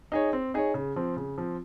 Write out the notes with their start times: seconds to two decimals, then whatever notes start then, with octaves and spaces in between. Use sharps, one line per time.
0.12 D#4 G#4 C#5
0.33 C4
0.54 D#4 G#4 C#5
0.74 C#3
0.96 F3 C4
1.16 C#3
1.38 F3 C4